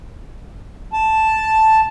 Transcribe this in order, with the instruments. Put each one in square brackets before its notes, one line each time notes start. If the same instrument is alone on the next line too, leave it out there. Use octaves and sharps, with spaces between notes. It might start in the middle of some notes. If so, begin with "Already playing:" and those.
[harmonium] A5